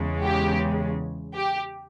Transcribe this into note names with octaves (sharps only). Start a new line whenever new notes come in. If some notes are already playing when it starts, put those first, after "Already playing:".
Already playing: E2 C#3 G#3
G4
G4